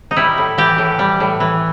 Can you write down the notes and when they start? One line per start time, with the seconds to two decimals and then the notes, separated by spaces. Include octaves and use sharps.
0.11 D#4
0.17 G3 E4
0.38 A2
0.58 E3 G4
0.78 A2
0.99 G3
1.20 A2
1.40 E3